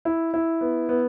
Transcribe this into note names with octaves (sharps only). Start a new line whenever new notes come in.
E4
E4
B3
B3